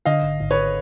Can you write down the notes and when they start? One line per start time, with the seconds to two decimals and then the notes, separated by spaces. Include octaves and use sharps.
0.05 D3 D#5 F5
0.22 G#1
0.40 G#1
0.51 B4 C#5